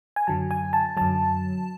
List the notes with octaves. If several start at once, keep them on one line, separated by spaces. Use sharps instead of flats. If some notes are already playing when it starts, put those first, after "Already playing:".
G#5
F#2 D3 F#3 A5
G#5
A5
F#2 D3 F#3 A5